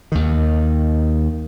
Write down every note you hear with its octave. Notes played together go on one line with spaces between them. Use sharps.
D#2 D#3